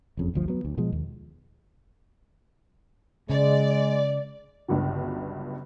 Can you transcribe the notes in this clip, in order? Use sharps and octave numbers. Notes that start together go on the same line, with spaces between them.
F#1 F2 C#3
G1 D2 F3
F#3 B3
D2
B2 F3 G#3
D#2
C#3 G#3 D5
G1 C#2 G2 D3 F#3